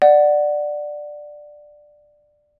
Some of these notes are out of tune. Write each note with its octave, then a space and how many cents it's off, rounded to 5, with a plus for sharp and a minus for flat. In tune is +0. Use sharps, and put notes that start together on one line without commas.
D5 +10 F#5 +0